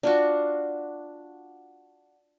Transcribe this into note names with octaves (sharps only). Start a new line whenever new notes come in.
D4 F4 F#4